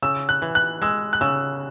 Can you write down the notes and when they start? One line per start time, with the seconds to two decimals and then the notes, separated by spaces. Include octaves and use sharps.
0.02 C#3 E6
0.29 F#6
0.42 E3
0.55 F#6
0.82 G#3 E6
1.13 F#6
1.21 C#3 E6